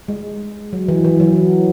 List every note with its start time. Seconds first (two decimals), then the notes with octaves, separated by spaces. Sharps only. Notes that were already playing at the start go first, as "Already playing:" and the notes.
0.08 G#3
0.73 F#3
0.88 E3
1.05 E3
1.20 F#3